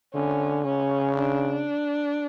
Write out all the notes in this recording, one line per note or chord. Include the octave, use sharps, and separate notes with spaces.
D3 C#4
C#3 C#4
D4